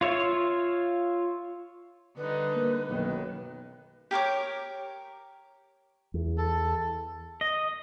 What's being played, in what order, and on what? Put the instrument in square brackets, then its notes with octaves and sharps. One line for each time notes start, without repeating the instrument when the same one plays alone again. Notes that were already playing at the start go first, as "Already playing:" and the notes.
[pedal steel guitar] F4 C#5 E5
[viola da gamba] D3 G3 D#4 [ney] B4
[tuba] A#3
[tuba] B1 [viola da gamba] F#2 D#3
[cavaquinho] G4 A#4 C#5 D6
[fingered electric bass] E2
[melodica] A4
[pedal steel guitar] D#5